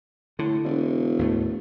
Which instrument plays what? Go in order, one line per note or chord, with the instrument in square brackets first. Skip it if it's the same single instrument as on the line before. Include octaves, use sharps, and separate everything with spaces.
[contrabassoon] A2 [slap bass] D3
[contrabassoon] E1
[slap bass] D#2 A2 A3